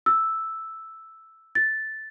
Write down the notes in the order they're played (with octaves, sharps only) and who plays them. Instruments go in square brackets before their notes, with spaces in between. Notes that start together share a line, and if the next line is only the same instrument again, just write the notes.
[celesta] E6
A6